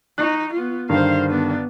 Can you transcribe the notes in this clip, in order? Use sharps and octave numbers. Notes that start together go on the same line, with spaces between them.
D#4 C#6 F#6
B3 F4
G2 D3 D#3 C5 F5
B3 D4